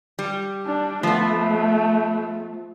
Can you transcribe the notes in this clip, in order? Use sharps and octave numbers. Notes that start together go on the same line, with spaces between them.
G3
D4
F3 A3 B3